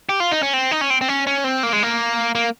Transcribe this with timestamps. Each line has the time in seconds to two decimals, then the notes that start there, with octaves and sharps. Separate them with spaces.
0.09 G4
0.20 F4
0.32 D#4
0.43 C#4
0.54 C4
0.71 D#4
0.81 C#4
0.90 C4
1.01 C4
1.08 C#4
1.27 C#4
1.44 C4
1.63 A#3
1.73 G#3
1.83 A#3
2.35 A#3